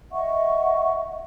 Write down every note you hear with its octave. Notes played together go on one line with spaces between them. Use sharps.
D#5 E5 F#5 C#6